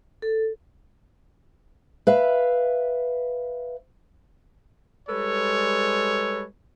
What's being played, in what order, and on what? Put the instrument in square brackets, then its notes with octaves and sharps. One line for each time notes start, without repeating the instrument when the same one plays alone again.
[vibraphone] A4
[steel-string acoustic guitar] B4 E5 F5
[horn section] G3 G#3 A4 B4 C#5